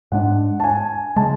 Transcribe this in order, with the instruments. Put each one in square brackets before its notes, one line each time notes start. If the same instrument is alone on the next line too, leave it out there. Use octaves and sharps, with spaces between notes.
[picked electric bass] G#2 G#3 D4 [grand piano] F#5
[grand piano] A5
G#5
[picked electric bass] C#3 G#3 [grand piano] A5